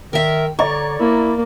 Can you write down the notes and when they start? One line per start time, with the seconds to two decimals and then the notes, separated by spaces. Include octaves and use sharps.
0.13 D#3 A#4 E5
0.59 D3 C#5 D5 A#5 C#6
0.99 A#3 E4